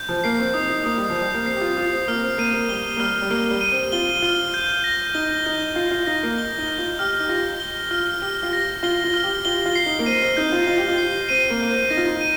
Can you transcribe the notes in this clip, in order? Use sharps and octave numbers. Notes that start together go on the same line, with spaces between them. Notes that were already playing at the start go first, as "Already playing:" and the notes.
Already playing: G6
F3
A#3 C7
C4
D#4 D#6
D#4
A#3 D#6
G3
F3
G3 G6
A#3
C4 C7
G4
F4
F4 D#6
C4
A#3 F6
C4
A#3 D#7
A#3
G3 G7
A#3
G3 F6
G3
A#3 F6
G3
D#7
C4
F4 G7
F4 F6
G6
A#6
D#4 G7
D#4 G6
F4 G6
F4
D#4 A#6
A#3
G7
D#4
G6
F4
G4 F6
D#4
F4 A#6
G7
F4 F6
G4 F6
F4
A#6
F4 G7
F4
F6
G4
F4 G7
F4
C7
D#4
A#3
C4 D#7
C4
D#4 G6
F4
F4 G7
G4
F4
C7
C4 D#7
A#3
A#3 G6
C4
D#4 A#6
F4
D#4
D#7